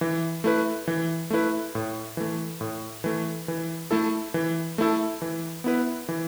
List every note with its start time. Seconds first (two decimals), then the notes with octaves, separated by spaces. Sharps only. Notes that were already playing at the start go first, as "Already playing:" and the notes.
0.01 E3
0.44 A3 E4 B4
0.88 E3
1.30 A3 E4 B4
1.75 A2
2.17 E3 A3
2.61 A2
3.04 E3 A3
3.48 E3
3.91 A3 E4 A4
4.34 E3
4.78 A3 E4 A4
5.22 E3
5.64 B3 E4 B4
6.09 E3